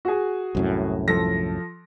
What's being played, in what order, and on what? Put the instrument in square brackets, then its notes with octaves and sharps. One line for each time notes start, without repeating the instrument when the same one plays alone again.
[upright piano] F#4 G#4
[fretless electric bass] C2 F#2 A2
[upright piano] F3 A4 A#6